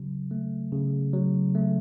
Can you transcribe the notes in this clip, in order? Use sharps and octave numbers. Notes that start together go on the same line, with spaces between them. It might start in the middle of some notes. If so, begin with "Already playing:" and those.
Already playing: C#3 F#3
A3
C#3
F#3
A3